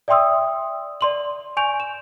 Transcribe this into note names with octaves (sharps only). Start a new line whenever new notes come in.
D5 E5 G5 C6 D#6 E6
D5 C6 F#7
G#5 C#6 G6 D7 F7
E7